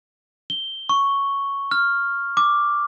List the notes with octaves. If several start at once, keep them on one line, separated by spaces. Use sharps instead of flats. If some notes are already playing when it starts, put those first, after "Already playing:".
G7
C#6
F6
D6